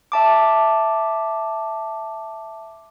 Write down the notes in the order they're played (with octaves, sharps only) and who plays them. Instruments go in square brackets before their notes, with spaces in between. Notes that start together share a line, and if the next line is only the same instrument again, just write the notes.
[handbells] E5 A5 D6